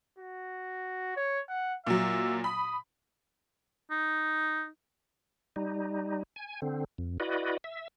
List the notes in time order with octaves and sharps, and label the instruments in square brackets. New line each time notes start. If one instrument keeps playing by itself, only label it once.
[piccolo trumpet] F#4
C#5
F#5
[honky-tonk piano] A#2 F#3 [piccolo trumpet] E5
[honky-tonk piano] B5 [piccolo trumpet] D#6
[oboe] D#4
[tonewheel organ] G3 D#4
G#5
D3 C4
F2
E4 F#4 B4 D5 D#5
E5